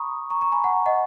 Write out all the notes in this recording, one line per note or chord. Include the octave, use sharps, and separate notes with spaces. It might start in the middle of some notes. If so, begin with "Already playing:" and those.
Already playing: A#5 B5 C#6 D#6
A#5 C#6
A#5 C#6
G#5 B5
F#5 A#5
D#5 F#5